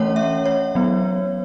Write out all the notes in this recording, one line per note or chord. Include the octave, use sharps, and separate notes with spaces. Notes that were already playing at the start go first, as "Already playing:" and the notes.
Already playing: E3 A3 C#4 C#5 F#5
E5
C#5
F#3 B3